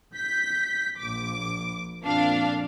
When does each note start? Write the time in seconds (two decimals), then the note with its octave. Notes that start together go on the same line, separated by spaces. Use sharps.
0.14 G6 B6
0.99 A#1 D6
2.02 F2 A#2 D4 F5